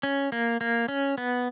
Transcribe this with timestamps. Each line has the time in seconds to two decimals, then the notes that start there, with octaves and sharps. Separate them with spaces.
0.03 C#4
0.32 A#3
0.61 A#3
0.88 C#4
1.18 B3